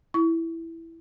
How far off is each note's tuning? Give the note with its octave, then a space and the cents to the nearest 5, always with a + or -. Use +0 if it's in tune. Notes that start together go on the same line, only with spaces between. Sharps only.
E4 +0 C#6 +25